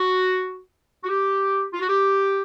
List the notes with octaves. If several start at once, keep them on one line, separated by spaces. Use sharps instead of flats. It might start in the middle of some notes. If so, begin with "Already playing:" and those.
Already playing: F#4
F#4
G4
F4
F#4
G4